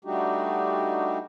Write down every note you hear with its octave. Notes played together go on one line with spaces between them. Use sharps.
G3 A3 D4 D#4 F#4 G4